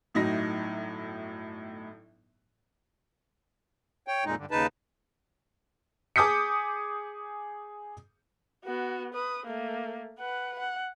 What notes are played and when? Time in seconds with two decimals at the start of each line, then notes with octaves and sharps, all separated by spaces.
0.14 G1 A2 F#3 D#4 A#6
4.08 C#5 G5
4.25 F2 A#2 G#3 D#4
4.37 G2 D3
4.51 D#2 C#3 D#4 B4 A5
6.16 G#4 D6 D#6 G6 B6 C#7
8.64 B3 F#4
9.14 B4 D#6
9.46 A3 A#3
10.19 B4 F#5
10.59 F#5